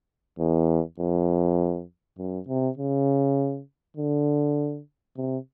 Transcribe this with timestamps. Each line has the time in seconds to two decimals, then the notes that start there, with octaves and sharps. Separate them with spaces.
0.39 E2
1.00 F2
2.18 F#2
2.48 C3
2.78 C#3
3.97 D3
5.17 C3